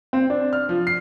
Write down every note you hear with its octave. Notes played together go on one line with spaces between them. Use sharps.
C4
D4
F6
F3
C7